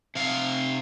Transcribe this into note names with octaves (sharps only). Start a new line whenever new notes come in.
C3 F5